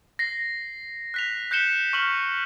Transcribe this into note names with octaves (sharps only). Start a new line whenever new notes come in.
A#6 C7
F#6 B6 F7
F#6 G6 B6 C#7 E7 G7
C#6 F6 F#7